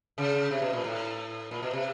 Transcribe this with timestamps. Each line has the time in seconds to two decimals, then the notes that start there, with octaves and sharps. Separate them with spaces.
0.18 C#3
0.51 C3
0.62 B2
0.73 A#2
0.84 A2
1.51 A#2
1.62 B2
1.73 C3